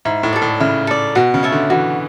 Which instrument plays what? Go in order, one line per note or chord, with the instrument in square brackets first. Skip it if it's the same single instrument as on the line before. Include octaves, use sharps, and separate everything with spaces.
[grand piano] G#2 [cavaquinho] E4
[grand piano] A2
[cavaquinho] A4 D5
[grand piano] A2
[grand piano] C#3 [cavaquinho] E4
[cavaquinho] A4 D5
[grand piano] B2 [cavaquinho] F#4
[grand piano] C#3
[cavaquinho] C#5 E5 A5
[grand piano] D3
[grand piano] E3 [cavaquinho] F#4